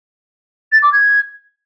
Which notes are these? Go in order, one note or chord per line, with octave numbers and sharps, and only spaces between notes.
A6
D6
G#6